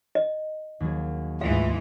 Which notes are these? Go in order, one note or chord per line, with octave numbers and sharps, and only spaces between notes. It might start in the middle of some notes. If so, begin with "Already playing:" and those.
D#5
D#2 F#3 G#4
D2 G#2 E3 A3 F4 F5